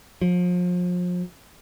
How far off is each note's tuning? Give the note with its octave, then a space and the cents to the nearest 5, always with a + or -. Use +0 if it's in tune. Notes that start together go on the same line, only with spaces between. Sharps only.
F3 +35